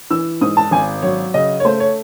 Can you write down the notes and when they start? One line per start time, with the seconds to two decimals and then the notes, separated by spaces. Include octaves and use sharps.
0.10 E3 E6
0.41 G#2 D#6
0.57 A5
0.71 G#1 G#5
1.02 F#3 C#5
1.34 C#3 D#5
1.60 C#5
1.65 A3 C5
1.80 C#5